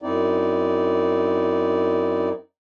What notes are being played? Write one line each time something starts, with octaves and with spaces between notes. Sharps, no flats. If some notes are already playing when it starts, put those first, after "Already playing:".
F#2 C4 D#4 E4 D5